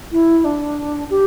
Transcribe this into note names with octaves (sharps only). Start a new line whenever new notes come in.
E4
D4
G4